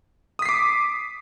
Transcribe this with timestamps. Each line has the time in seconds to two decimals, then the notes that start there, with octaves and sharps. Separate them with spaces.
0.39 D#6
0.42 B6
0.46 C7
0.49 D6